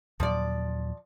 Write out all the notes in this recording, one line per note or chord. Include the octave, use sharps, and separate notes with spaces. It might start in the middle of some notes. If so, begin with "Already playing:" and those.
D#2 A#2 F3 F#3 D5